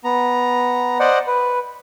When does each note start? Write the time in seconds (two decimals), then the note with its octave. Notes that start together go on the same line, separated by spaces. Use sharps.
0.04 B3 A#5
0.99 C5 D5 D#5 F#5
1.27 B4